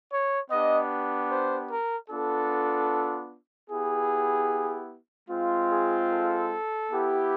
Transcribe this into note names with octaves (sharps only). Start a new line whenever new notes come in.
C#5
B3 D4 G4 D#5
C5
A#4
B3 D4 F4 A4
B3 E4 G4 G#4
G#3 C4 F4
G#4
A4
B3 E4 G4